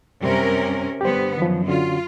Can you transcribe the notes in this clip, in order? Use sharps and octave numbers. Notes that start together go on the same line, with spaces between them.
F#2 C3 G3 C4 C#4 A#4
G2 D3 B3 G4 C5
F#2 D#3 F3
D3 C#4 F4 F#4